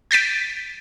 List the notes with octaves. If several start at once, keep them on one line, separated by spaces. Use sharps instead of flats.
G6 A6 B6 D7